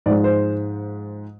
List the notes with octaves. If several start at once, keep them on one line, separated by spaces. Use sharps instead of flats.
G#2 F3 G#3 D5
C5